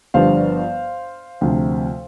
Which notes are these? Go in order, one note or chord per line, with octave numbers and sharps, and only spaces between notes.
G1 G2 F3 C5 F5
D2 C3 F3